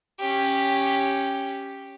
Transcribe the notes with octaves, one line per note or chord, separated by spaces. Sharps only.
C#4 G4